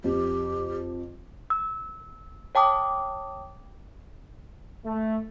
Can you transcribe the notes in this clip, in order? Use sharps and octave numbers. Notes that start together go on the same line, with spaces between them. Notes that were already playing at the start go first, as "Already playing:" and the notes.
F2 G4
E6
C#5 G5 A5 D6 D#6
A3